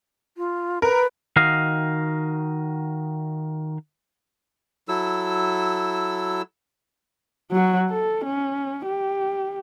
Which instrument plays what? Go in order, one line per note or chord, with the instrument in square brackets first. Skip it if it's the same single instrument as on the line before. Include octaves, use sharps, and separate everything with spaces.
[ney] F4
[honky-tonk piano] A#4 [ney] B4
[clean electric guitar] D#3 F#4 D#5 F5
[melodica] F#3 E4 A4 E6
[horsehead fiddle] F#3 F#4
A4
C#4
G4